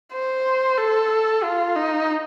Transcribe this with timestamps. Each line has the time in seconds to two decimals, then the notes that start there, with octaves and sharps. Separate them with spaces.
0.13 C5
0.77 A4
1.43 F4
1.76 D#4